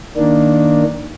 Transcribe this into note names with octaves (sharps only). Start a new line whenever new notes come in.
D#3 A#3 D4